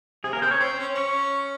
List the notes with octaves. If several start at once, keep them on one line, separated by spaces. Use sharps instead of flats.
C3 G#4
A#3 A#4
C4 C5
C#4 C#5
C4 C6
C#4
C#4 C#6